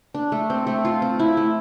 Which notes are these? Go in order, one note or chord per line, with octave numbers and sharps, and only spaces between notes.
D4
A3
C4
A3
F4
C4
E4
A3